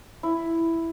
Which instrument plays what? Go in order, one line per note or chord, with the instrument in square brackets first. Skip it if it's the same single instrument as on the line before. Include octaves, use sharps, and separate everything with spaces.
[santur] E4